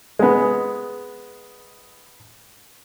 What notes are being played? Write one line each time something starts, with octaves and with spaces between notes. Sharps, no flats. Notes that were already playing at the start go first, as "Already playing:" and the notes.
G#3 B3